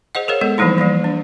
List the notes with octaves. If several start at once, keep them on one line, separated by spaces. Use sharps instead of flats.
G#4 C5 D#5 F#5
G#4 A#4 C#5 F5
G#3 B3 A4
E3 F3 G3 A#3 D#4 E4
E3 F3 G3 A#3
D4